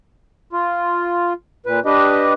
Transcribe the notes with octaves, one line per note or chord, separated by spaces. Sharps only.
F4
A#2 B4
D4 G4 B4 D#5